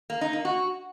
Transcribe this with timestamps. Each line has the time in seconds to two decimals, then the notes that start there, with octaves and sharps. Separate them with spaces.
0.10 A#3
0.21 D#4
0.33 A#3
0.45 F#4